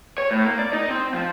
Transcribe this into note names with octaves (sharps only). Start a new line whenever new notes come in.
C#5
A2
A#3
D5
D#4
C4
F3